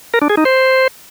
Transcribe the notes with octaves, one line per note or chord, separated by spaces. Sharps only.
A#4
D4
G#4
D#4
C5